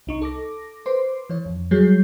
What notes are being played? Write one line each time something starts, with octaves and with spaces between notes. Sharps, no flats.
C2 D#4 C#6
A4 D6 A#6
B4 C5 C6 D6
E3 C#5
F2
F#3 G3 G#4 C#5 G6 C7